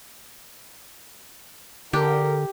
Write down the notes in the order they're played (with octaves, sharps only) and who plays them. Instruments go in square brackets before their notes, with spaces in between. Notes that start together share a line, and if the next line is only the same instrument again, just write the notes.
[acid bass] D3 [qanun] G4 [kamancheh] A#4